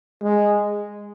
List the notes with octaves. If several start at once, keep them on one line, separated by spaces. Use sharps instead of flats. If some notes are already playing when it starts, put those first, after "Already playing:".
G#3